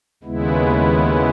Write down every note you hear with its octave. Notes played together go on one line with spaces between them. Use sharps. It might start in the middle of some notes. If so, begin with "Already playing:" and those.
D#2 C#3 G#3 B3 E4